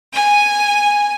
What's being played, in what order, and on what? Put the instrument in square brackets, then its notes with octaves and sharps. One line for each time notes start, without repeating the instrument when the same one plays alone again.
[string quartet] G#5